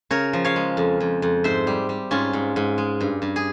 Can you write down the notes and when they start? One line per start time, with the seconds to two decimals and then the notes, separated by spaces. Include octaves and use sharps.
0.11 C#3 A#4 C#5
0.33 F3
0.44 C#5 F5
0.56 G#3
0.77 F2
1.00 F2
1.22 F2
1.44 G#2 C5 E5
1.67 G3
1.89 G3
2.11 G#2 C#4 F4
2.33 G#2
2.56 G#2
2.78 G#3
3.01 G2
3.22 G2
3.36 G#4